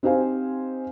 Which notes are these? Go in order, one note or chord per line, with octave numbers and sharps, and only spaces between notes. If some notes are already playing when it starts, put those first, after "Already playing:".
C4 D#4 G4 C5 F5 G#5